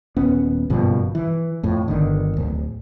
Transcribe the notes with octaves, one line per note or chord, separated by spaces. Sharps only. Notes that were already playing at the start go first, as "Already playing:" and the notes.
D#1 B3 C#4
F#1 G2 B2 F3
E3
F2 A2
G1 D3 D#3
D1